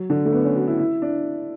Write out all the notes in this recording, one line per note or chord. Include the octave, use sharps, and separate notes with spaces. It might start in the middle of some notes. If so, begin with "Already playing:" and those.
Already playing: F#3
D3
A3
B3
C#4
F#4
E4
E4
D4